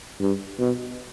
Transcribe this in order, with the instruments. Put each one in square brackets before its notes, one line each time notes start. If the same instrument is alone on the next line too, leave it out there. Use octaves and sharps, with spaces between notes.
[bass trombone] G2
B2